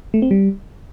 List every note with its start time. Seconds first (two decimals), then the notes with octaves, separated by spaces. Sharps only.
0.14 A3
0.22 C4
0.31 G3